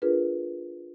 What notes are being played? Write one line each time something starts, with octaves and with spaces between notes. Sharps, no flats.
D4 F4 G#4 A#4 B4